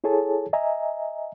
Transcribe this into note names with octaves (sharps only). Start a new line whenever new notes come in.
E4 G#4 A4 C#5 G#5 A5
D#5 E5 G#5 A#5